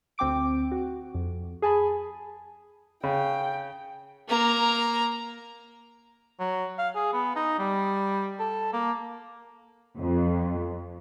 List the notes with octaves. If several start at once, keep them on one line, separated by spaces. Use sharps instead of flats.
D2 C4 G5 D6 D7
F#4
F2
G#4 G#5 A5 B5
C#3 G5
A#3 A#5
F#3
F5
G#4
B3
D#4
G3
A4
A#3
F2